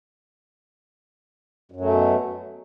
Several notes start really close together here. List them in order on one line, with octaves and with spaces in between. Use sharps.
F#2 F#3 A3 B2